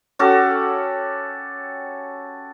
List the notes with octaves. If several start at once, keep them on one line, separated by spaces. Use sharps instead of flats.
C#4 F#4 G4 A4